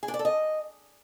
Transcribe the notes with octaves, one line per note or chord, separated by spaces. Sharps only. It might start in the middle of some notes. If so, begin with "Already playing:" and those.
G#4
D4
D5
A4
D#5